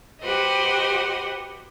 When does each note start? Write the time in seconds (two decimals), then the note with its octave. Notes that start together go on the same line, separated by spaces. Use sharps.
0.21 F#4 G4 B4 C5 D#5